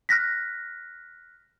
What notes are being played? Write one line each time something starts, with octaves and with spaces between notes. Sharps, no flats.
F6 F#6 A#6 B6